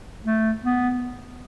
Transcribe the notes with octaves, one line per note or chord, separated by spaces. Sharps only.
A3
B3